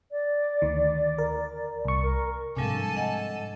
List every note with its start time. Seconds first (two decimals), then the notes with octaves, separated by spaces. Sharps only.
0.12 D5
0.62 D2 D#3
1.18 A#4
1.85 C2 C#6
2.03 A#4
2.57 G#2 C3 F3 G3 D4 A4 G#5 A5
2.96 D#5 F#5